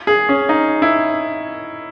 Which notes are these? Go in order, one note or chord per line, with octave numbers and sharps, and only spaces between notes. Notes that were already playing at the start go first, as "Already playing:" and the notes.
G#4
C#4
D#4
E4